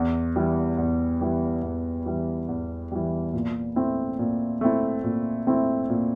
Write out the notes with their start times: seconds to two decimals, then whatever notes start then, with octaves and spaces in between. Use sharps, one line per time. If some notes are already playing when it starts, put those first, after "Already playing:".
Already playing: E2
0.36 E3 G3
0.78 E2
1.21 E3 G3
1.63 E2
2.06 E3 G3
2.49 E2
2.92 E3 G3
3.34 A#2
3.76 A3 C4 E4
4.19 A#2
4.61 A3 C4 E4
5.04 A#2
5.47 A3 C4 E4
5.90 A#2